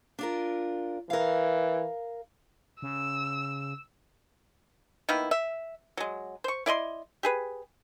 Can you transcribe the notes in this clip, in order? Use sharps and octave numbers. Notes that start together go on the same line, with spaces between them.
D4 F4 A#4
E3 A#4 F5
C#3 E6
D#3 A#3 B3 E4
E5
F#3 G#3
C5 C#6
E4 D5 D#5 C6
G4 G#4 B4